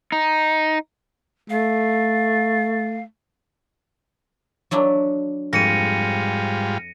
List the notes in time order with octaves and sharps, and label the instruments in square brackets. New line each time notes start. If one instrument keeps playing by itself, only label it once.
[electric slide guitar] D#4
[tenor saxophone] A3 [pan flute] F5
[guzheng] F#3 D4 E4
[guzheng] F2 [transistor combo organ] G#2 G3 F4 [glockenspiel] A#6 C#7 D#7